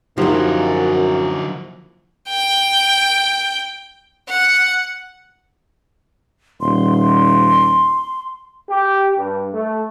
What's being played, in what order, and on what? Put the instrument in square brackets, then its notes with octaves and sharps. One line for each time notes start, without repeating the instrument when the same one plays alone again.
[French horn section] F#2 [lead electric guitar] D3 E4 [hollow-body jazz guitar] F3 A#3 [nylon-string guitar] F#3 D#4 G4
[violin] G5
F#5
[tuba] D#1 [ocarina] C6
[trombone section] G4
G2
A3